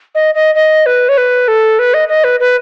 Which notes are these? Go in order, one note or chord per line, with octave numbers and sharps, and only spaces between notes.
D#5
D#5
D#5
B4
C#5
B4
A4
B4
D#5
D#5
B4
B4